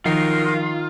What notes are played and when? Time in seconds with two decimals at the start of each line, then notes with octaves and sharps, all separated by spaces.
0.06 D#3 F3 F#3 D#4 F4 A#4 C7